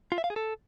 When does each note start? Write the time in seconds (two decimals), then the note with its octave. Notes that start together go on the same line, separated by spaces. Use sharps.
0.12 F4
0.18 E5
0.24 F5
0.30 G#4
0.36 A4